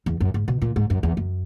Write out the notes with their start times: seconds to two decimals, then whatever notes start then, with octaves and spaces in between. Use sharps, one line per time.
0.06 E2
0.20 F#2
0.34 G#2
0.48 B2
0.62 A#2
0.76 G#2
0.90 F#2
1.03 E2
1.17 F#2